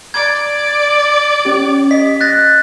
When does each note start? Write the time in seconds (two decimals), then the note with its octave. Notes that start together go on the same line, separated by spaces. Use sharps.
0.14 D5 G#6
1.45 C#4 G4
1.91 D#5 B6
2.21 F#6 A6 A#6